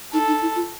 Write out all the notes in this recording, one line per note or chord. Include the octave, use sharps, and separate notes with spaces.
D#4 A4
D#4
E4
F4